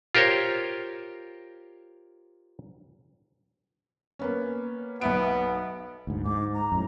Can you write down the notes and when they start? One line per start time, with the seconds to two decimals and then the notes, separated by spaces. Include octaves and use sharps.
0.15 F4 G4 A#4 C5 C#5
4.19 A#3 B3 C#4
5.01 B1 B3 E5 D7
6.07 D2 G#2
6.25 G#2 D6
6.54 A#5
6.72 F#2 A2